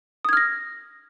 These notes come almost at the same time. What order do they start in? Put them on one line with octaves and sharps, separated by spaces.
D#6 G#6 F6 A#6